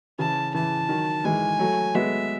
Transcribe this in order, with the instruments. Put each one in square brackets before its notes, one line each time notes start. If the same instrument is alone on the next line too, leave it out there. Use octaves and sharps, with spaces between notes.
[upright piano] C#3 E3 [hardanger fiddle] A5
[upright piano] C#3 E3 [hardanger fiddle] A5
[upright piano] D#3 F#3
[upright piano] E3 G#3 [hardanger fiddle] G#5
[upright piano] F#3 A3
[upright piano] G#3 B3 [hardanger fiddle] E5